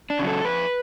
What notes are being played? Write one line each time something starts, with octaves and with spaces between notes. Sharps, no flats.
D4
C#3 F#3
A4
F2 B4